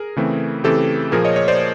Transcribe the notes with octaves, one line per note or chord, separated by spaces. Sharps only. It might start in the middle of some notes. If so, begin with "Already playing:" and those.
Already playing: G#4 A#4
C#3 E3 A3 C4
C#3 E3 A3 C4 G4 A4
A#2 F3 A#3 G#4 A#4
C#5 D#5
C#5 D#5
C5 D5